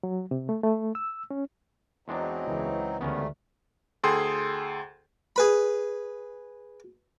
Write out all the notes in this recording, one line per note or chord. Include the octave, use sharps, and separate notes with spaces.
F#3
C3
A3
A3
E6
C#4
E2 F#3 G#3 C4 D4 D#4
C#2 C#3 E3
D2 G#2 G3 A3 B3 C#4 A#4
D2 G#4 A4 G5 C6
G#4 B4 B5